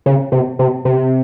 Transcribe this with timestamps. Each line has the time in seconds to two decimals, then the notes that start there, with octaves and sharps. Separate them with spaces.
0.06 C#3
0.32 C3
0.59 C3
0.85 C3